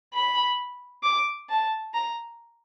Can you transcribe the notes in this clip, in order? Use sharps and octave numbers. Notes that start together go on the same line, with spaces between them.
B5
D6
A5
A#5